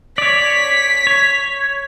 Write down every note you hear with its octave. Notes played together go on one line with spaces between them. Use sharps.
C#5 D5 B6
C#5